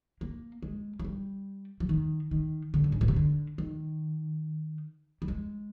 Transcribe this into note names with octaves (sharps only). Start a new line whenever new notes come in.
A#3
G#3
F3
G3
F3
D#3
D#3
D3
G2
G#2
A#2
C3
D3
D#3
G3
G#3